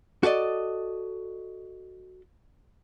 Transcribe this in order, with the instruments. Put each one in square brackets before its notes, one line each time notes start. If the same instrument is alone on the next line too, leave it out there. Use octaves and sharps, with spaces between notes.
[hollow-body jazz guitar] F#4 A4 D5 D#5